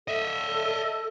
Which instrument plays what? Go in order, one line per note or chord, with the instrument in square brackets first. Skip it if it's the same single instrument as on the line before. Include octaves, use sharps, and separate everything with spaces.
[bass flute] A4 [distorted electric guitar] D#5 E5